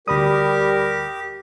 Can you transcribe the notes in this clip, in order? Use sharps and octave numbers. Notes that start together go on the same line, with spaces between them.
D2 G3 G4 A#4 B5 D#6